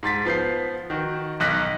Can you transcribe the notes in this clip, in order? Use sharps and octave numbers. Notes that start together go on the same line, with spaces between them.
G#2 C6 A6 B6
F3 B3 G6 C7
D#3 F#4
B1 D#3 D#4 F#6 A#6 B6